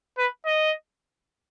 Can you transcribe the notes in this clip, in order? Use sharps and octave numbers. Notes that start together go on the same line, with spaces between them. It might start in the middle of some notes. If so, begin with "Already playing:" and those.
B4
D#5